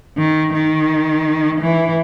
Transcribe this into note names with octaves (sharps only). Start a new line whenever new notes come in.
D#3
D#3
E3